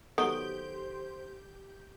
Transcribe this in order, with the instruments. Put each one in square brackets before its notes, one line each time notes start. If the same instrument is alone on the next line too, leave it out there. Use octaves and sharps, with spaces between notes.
[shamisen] D#3 F#3 B3 [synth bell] G4 G6 [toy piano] A4 [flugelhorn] C5